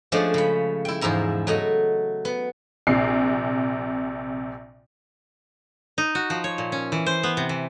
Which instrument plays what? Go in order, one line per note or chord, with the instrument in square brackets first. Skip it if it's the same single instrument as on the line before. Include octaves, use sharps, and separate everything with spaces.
[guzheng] F3 G#3 A3 C#4 D4
C#3 B5
E4 G5
E2 G#2 F3 E4 A#5
F#3 A3 D#5
B3
[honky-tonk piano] A#1 C3 C7
[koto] D#4
F#4
F3
C#5
A#2
C#4
E3
C5
B3
C3
E3